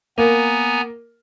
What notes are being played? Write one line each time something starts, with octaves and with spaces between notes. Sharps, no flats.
A#3 B3 G#5 A#5